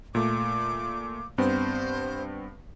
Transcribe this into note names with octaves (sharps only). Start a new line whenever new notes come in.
A#2 A3 D6
G2 B3 C4 C5